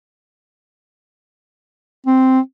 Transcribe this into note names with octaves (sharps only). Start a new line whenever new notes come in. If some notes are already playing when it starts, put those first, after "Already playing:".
C4